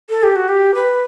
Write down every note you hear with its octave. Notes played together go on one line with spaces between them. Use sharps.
A4
G4
F#4
G4
B4